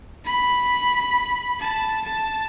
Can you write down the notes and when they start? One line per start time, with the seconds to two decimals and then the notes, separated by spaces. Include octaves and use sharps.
0.25 B5
1.60 A5
2.05 A5